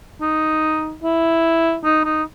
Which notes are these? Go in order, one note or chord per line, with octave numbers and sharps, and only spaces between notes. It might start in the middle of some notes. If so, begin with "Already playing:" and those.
D#4
E4
D#4
D#4